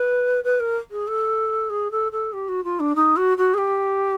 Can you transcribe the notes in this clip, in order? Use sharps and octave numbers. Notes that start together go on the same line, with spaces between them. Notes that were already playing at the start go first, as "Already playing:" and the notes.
Already playing: B4
B4
A#4
G#4
A4
G#4
A4
A4
G4
F#4
F4
D4
D#4
F#4
F#4
G#4
G4